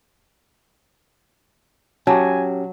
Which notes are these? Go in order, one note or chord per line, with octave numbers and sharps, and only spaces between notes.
F#3 C#4 G4 G#5 A5